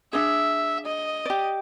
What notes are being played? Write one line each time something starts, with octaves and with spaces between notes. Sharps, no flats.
D4 G#4 E5
D#5
G4 D5